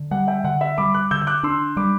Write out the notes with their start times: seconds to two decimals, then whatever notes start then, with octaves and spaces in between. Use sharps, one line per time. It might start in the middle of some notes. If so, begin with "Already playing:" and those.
Already playing: D3
0.11 G3 F#5
0.27 E5 G5
0.44 D3 F#5
0.61 E5
0.78 G3 B5 D6
0.94 D6 F#6
1.11 D3 E6 G6
1.21 G6
1.27 D6 F#6
1.43 D4 C6 E6
1.77 G3 B5 D6